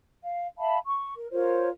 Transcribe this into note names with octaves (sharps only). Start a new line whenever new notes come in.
F5
E5 F5 A5 B5
C#6
A#4
F4 A#4 C5 C#5